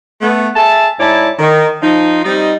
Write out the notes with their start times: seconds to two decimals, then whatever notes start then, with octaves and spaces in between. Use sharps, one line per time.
0.22 A3 B3
0.56 G#4 E5 A5
1.00 G#2 E4 C#5 D5 A5
1.39 D#3
1.83 F3 D#4
2.24 G3 C4 D#4